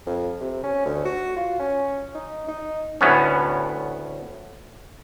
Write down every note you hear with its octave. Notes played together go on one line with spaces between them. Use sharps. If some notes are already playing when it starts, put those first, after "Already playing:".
F2
C3
C#4
D2
F#4
F4
C#4
D#4
D#4
D2 A2 B3 C#4